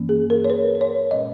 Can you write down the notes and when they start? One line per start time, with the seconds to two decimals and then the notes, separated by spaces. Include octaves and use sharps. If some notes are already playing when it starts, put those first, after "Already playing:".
Already playing: G2 E3 A#3 C#4
0.09 G#4
0.30 A#4
0.45 C#5
0.50 B4
0.75 B4
0.81 C#5
1.11 A#2 G#3 C#4 D#5